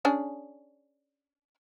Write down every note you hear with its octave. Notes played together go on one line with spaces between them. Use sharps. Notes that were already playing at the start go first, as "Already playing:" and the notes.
C#4 D4 G#4